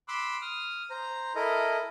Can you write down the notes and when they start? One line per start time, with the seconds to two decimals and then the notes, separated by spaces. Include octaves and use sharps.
0.08 B5 C6 D6 E6 F#6
0.42 D#6 F6
0.90 C5 A#5
1.35 E4 A4 A#4 D#5